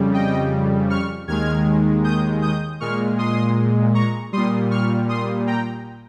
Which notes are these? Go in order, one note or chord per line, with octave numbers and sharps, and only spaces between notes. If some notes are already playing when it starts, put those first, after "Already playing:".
Already playing: F2 C#3 G3
D#5 G5
C#6 F6
D#2 D#3 G#3 F6 G#6
D#6 G6
D#6 G6
A#2 G#3 C#6 F6
C6 D#6
A#5 C#6
A#2 G3 C6 D#6
C#6 F6
C6 D#6
G5 A#5